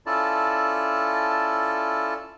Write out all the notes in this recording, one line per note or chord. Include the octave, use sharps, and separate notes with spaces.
C#4 E4 F4 A4 D5 A5